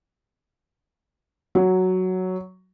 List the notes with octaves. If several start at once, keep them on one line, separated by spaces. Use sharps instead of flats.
F#3